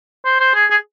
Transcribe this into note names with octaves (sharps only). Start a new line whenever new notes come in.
C5
C5
G#4
G#4